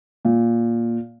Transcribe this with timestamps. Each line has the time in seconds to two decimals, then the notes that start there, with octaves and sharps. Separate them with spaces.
0.25 A#2